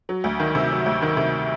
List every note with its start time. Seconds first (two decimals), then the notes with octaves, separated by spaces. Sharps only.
0.09 F#3
0.24 D2
0.40 D#3
0.55 C3
0.71 F#3
0.86 D2
1.02 D#3
1.17 C3